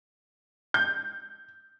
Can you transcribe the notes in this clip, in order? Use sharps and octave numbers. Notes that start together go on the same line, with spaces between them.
G6